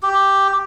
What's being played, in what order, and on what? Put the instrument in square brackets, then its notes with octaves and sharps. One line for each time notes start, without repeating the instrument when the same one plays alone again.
[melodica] G4